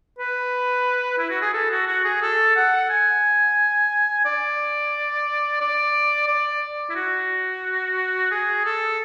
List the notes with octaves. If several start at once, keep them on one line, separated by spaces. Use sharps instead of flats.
B4
E4
F#4
G#4
A4
F#4
F#4
G#4
A4
F#5
G#5
D5
D5
D5
E4
F#4
G#4
A4